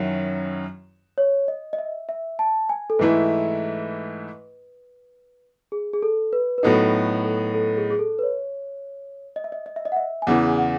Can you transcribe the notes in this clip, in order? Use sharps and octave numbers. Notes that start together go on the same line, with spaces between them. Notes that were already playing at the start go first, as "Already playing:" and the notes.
Already playing: F#2 D#3 F#3 C#4 E4
C#5
D#5
D#5
E5
E5
A5
G#5
A4
G#2 E3 A3 E4 B4
G#4
G#4
A4
B4
B4
A2 F#3 B3 D#4 A4
A4
A4
G#4
G#4
A4
B4
C#5
D#5
E5
D#5
D#5
E5
D#5
F#5
E5
G#5
E2 C#3 E3 F#5
F#5